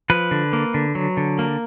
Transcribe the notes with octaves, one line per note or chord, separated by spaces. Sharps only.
F3 B4
D3
A#3
D3
F#3
D3
A#3